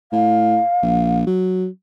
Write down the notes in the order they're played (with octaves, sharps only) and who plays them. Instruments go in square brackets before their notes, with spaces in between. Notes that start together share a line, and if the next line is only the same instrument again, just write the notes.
[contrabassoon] A2 [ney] F5
[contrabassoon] A#1
F#3